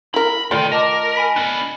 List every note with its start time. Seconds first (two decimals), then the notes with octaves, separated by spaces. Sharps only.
0.14 E4 A#4 B5
0.51 D2 D#3 A3 F4 D5 C6
0.72 A#4 D#5 A5 D6
1.15 G#5 B5 B6
1.36 B3 D4